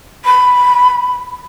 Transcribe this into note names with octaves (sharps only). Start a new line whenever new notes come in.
B5